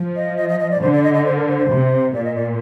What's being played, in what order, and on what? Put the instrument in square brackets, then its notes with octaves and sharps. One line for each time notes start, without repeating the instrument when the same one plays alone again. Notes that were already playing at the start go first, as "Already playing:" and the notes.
Already playing: [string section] F3
[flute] D#5
D#5
D#5
D#5
D5
[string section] D3 [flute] C5
[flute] D5
D#5
D#5
C5
A#4
C5
C5
[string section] C3
[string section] A#2 [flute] D5
[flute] D#5
D5